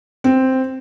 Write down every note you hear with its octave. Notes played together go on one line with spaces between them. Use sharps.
C4